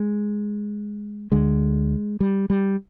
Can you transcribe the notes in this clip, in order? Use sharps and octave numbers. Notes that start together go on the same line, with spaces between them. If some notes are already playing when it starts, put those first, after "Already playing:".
Already playing: G#3
D2 D3 G#3
G3
G3